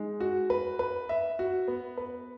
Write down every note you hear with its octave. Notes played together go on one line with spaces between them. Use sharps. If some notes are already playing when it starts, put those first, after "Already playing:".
Already playing: G#3 D#4
F#4
B4
B4
E5
F#4
B3
B4